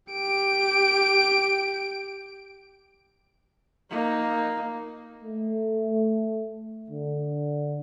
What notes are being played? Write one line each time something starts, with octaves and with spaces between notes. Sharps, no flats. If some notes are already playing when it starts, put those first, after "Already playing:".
G4 D7
A#3 D#4
A3
D3